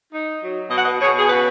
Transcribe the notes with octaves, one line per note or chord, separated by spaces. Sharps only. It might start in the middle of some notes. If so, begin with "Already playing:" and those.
D#4
F#3
B2 D#5
F#5
B4 D#5
B2 G#4 C#5
G#4
C#3 F#4 B4